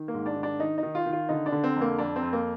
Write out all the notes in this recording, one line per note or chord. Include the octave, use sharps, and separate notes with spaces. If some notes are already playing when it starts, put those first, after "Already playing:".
Already playing: D#3
A#3
G#2
D4
D#3
D4
D#3 D#4
D#4
D#3
F4
D#3
F4
D3 D#4
D4
D3
C4
F2
A#3
F2 D4
C4
F2
A#3